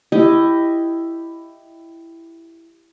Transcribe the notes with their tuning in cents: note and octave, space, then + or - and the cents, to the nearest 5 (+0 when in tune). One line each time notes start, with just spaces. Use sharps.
E4 +10 G4 +0 D#5 +0